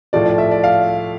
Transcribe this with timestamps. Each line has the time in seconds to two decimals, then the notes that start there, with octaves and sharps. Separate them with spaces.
0.13 A2 F3 A3 D5
0.26 D5
0.38 E5
0.51 D5
0.64 F5